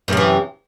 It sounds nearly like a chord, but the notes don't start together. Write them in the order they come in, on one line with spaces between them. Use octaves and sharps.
F#2 C3 E3